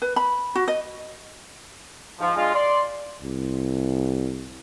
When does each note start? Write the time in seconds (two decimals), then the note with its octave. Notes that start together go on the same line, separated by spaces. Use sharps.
0.02 B4
0.16 B5
0.55 F#4
0.68 D#5
2.20 G#2 F3
2.35 G#3 D4 F4
2.54 D5 C6
3.22 C2